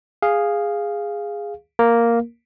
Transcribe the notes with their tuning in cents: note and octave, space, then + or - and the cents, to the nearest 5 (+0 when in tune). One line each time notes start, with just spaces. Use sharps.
G#4 -10 F5 +0
A#3 +0 A#4 +0